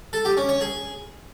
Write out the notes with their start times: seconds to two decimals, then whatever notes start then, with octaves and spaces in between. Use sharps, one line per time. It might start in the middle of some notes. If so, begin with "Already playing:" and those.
0.13 A4
0.25 G4
0.37 C#4
0.49 C#5
0.61 G#4